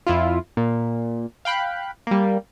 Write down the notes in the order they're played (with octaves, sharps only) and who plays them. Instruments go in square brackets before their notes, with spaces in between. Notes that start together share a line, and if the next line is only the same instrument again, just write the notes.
[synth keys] F2 E4 F4
A#2
F5 G5 B5 F#6
G3 A#3